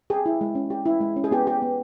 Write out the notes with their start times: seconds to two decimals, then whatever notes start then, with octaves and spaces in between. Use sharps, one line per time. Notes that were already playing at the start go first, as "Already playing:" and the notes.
0.10 G4 G#4
0.26 E4
0.41 G#3
0.55 C#4
0.70 G4
0.85 E4
1.01 G#3
1.16 C#4
1.24 G#4
1.31 B3 G4
1.47 G4
1.62 B3